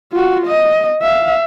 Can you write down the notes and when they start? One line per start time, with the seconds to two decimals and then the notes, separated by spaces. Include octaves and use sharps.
0.12 F4 F#4
0.47 D#5
1.02 E5 F5